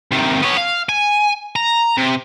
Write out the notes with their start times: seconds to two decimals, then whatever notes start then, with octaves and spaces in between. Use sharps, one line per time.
0.12 C3 D#3
0.42 B3 C#5
0.57 F5
0.89 G#5
1.56 A#5
1.97 C3